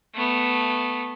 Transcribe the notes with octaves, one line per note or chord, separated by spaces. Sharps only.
A3 B3